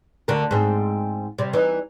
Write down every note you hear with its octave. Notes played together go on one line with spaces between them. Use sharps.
D2 D3 A#4
G#2 C4
C3 G3
E3 D#4